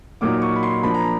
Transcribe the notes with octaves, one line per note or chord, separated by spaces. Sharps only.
A#2 F#3 A#3 D#4 D6
C#6
B5
C6
F3 A#3 D4 B5
A#5